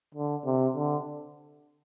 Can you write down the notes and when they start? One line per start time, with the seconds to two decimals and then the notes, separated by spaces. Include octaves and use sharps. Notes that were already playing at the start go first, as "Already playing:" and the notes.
0.15 D3
0.46 C3
0.76 D3